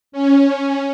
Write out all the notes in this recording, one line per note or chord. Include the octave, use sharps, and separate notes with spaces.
C#4